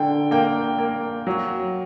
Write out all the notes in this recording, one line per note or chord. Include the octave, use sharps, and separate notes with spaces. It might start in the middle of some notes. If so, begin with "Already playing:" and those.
Already playing: D3 G5
A#3 G5
A#3
F#3